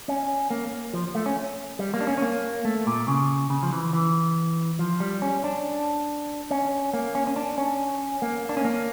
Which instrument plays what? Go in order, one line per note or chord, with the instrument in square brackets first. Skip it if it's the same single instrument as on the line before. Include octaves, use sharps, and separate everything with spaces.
[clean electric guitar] C#4
A#3
F3
A3
C#4
G3
A#3
D4
C#4
C#4
A#3
A3
A#2
C#3
C#3
F3
E3
E3
F3
G3
C#4
D4
C#4
A#3
C#4
C#4
D4
C#4
A#3
D4
C#4
A#3